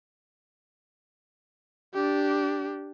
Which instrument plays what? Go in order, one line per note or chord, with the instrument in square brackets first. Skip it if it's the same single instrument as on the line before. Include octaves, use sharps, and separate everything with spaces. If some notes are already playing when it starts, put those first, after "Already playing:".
[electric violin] D4 G4